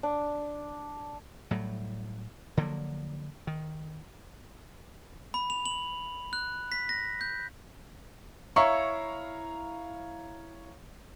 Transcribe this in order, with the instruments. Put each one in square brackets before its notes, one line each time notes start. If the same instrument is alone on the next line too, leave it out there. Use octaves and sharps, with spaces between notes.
[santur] D4
[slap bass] A2 F#3 G3
D3 F3 F#3 A#3
D#3
[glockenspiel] B5
F7
F#7
F#6
B6
A#6
G6
[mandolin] E4 C#6 [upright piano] C#5 F5 A#5